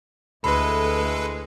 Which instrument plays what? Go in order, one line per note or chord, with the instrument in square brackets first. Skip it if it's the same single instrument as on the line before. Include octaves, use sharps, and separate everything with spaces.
[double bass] D2 [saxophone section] E3 G#3 [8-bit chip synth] A4 B4 [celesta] B5